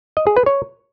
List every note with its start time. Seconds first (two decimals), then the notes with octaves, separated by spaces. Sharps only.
0.17 D#5
0.27 G#4
0.37 B4
0.46 C#5